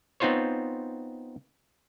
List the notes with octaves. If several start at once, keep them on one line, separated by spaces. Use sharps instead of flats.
B3 C4 D#4 F4 C5 C#5